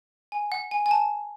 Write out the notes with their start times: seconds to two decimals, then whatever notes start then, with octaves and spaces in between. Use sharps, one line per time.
0.32 G#5
0.52 F#5
0.71 G#5
0.86 G#5
0.91 A5